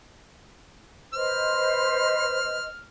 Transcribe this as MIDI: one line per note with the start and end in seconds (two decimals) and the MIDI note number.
1.13 2.67 71
1.13 2.67 72
1.13 2.67 75
1.13 2.88 89